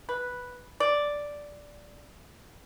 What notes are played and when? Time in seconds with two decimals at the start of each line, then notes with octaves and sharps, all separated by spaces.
0.09 B4
0.80 D5